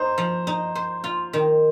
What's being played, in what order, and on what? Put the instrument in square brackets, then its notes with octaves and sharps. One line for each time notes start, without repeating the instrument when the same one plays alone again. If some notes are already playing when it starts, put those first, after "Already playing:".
Already playing: [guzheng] D#4 [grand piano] C5
[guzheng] F3
D#4
C5
F4
D#3